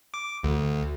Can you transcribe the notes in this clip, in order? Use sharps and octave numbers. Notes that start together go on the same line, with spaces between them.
D6
D2